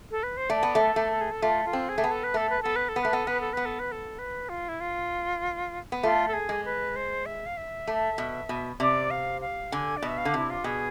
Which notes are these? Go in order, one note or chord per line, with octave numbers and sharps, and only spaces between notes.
A4
B4
C5
A3 D5
B3
A3
A4
A3
A4
G#4
A4
A3 F4
F4
C4
G#4
A3
B3
A4
B4
A3 A4
B4
B3 A4
B4
A4
B3
A3 B4
B3 A4
B3 B4
A4
B3 B4
A4
B4
A4
B4
F4
E4
F4
B3
A3 F4
A4
G#4
G#3
B4
C5
E5
F5
E5
A3
B2
B2
C3 D5
F5
F5
D3 G#5
D5
B2 E5
F5
D3
C3 E4
F4
B2 G#4